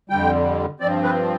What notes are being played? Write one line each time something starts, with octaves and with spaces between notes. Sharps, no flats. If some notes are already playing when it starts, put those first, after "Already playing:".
F2 D3 G3 G5
G2 F3 C4 D5
B4